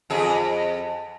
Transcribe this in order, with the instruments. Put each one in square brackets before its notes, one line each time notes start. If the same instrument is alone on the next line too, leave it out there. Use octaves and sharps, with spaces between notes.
[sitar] F2 G#4